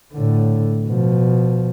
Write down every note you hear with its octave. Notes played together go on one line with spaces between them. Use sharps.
A2 D3
B2 F3